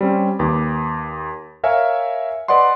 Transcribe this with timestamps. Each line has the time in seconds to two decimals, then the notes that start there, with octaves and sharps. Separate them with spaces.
0.01 G3 C4 C#4
0.39 D#2 B4 D6
1.63 A#4 C#5 E5 F5 G#5
2.48 B4 D5 D#5 F#5 C6